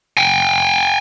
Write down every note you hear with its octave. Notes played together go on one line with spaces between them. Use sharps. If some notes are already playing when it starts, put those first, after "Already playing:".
G5 G#5